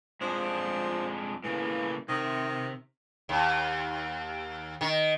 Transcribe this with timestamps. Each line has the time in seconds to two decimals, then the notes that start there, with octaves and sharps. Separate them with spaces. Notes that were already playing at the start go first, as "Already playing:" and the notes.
0.21 F2 F3 G#3 D4
1.44 A2 C#3 E3 A#3
2.08 C3 D#3
3.29 D#2
4.81 D#3